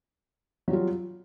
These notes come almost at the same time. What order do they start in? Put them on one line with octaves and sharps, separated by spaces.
F#3 G3 F4